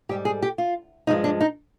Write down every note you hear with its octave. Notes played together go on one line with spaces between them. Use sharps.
G#2 G3 G4
G#4
G4
F4
G2 F3 G#3 D#4
D4
D#4